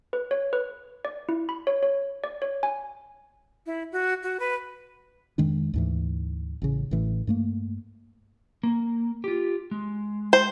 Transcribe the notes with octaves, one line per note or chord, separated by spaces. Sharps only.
B4
C#5
B4
D5
E4
B5
C#5
C#5
D5
C#5
G#5
E4
F#4
F#4
B4
F2 D#3 G#3 D4
D2 G#2 E3
A1 C#3
A1 A2 E3
G2 A3 A#3
A#3
F4 G4
G#3
C5